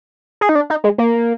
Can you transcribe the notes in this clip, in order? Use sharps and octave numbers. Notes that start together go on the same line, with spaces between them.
G#4
D#4
D4
D#4
G#3
A#3